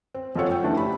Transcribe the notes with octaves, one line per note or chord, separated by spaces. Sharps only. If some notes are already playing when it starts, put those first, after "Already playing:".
C4
F2 F4 A4 C#5 F#5
G5
C#3 E3 A3 D4
G4 B5